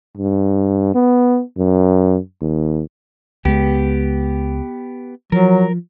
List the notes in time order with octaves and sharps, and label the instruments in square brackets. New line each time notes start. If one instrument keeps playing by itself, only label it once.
[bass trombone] G2
B3
F#2
D#2
[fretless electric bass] C#2 G#3 [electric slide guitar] B3 G4
[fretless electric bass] F3 [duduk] F#3 [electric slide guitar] A#4